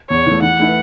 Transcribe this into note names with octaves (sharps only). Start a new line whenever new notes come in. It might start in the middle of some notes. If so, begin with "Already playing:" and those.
E2 C#5
E3 A3
E3 F#5
A3 E4 B4